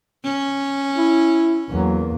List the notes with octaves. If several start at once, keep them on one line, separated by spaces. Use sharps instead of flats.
C#4
E4
E2 F#3 A#3